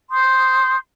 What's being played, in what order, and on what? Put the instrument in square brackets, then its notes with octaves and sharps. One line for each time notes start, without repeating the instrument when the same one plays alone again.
[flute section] C6 D#6 G6